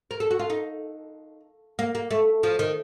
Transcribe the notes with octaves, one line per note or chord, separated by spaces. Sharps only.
A#4
A4
F#4
F4
D#4
A#3
A#3
A3
F3
D#3